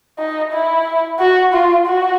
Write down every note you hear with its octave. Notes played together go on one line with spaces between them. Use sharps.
D#4
E4
F#4
F4
F#4